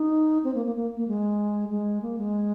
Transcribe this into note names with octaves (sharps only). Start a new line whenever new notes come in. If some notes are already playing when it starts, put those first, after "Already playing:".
Already playing: D#4
C4
A#3
A#3
A#3
A#3
G#3
G#3
A#3
G#3